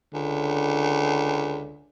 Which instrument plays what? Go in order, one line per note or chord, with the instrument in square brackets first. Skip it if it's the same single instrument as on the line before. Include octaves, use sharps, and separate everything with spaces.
[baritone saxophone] C#2 [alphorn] D3